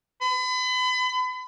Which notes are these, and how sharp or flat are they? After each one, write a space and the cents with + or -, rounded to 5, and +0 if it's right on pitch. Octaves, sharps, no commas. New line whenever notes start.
B5 +35